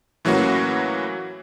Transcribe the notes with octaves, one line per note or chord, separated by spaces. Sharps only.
A2 E3 F#3 A#3 C#4 F#4